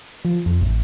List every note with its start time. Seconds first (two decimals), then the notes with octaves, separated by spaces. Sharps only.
0.25 F3
0.46 F2
0.61 A1